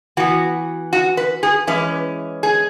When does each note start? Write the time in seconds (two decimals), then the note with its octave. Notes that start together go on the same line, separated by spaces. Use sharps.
0.17 E3 B3 F#4
0.93 F#4
1.17 B4
1.43 G#4
1.67 E3 G#3 C#4 B4
2.43 G#4